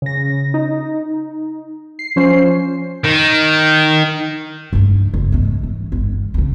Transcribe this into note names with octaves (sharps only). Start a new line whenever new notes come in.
C#3 A#6
D#4
C7
F3 C#4 C5 C7
D#3
G2 A3
F#1
G#2 A3
E3
G1 G#2
F2 C#3